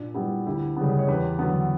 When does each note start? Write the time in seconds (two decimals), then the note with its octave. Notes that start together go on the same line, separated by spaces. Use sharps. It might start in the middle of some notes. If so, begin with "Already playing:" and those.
Already playing: A#2 D4
0.14 G3 B3 E4 G4
0.46 D2 E4 G4
0.76 C#3 G3 B3
0.99 C#5
1.08 E2 G4 B4
1.39 D3 F#3 B3